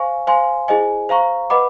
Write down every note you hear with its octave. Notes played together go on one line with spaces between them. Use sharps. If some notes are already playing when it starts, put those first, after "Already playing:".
Already playing: C5 F5 G#5 C#6
C5 F5 G#5 C6
E4 G#4 C5 D#5 G#5
C5 F5 A#5 C#6
B4 D#5 F#5 B5 D6